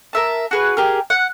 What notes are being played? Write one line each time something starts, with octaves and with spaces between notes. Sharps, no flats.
A#4 E5 A5
F#4 G#4 B4
G4 G#4 A#4
F#5